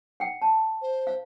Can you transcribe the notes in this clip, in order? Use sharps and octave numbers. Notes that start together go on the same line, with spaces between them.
F#5 G5
A5
C5
F5